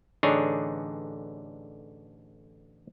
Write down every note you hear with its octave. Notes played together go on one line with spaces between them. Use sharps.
A1 D3 D4 D#4 G#4 C#5